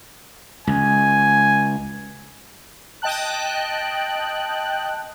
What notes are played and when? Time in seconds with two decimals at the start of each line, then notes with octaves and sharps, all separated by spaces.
0.67 C#2 G#5
3.02 D#5 G5 A5 F#6